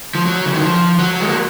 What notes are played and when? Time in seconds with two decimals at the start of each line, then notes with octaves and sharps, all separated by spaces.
0.15 F3
0.26 F#3
0.46 C#3
0.54 D#3
0.62 F3
0.99 F#3
1.20 G#3
1.28 A#3